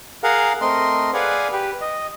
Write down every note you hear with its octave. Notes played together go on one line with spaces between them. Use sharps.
G#4 A#4 F5 F#5
A3 C4 A#4 D#5 C6
G#4 B4 D5 F5 F#5 G#5
G4 B4
D#5